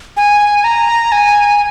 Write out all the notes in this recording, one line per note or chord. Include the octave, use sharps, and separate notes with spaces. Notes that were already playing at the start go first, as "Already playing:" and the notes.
G#5
A#5
G#5